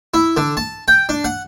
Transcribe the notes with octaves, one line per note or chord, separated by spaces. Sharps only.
E4
D3
A5
G5
D4
F#5